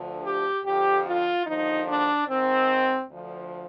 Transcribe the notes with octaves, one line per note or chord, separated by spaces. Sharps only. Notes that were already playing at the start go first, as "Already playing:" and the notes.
Already playing: D2 D3 F3
G4
F2 D3 F3 G4
F4
D#2 D3 F3 D#4
D4
G#2 D#3 C4
D2 D3 F3